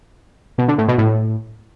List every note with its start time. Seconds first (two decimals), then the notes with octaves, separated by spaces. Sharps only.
0.58 B2
0.68 D3
0.78 A2
0.88 B2
0.98 A2